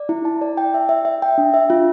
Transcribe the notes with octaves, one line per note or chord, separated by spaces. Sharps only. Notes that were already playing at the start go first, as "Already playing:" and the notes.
Already playing: D5
E4
A5
D5
G5
E5
E5
E5
G5
D4
E5
F4